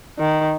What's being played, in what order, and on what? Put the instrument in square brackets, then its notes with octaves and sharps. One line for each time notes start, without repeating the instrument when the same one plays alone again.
[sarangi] D#3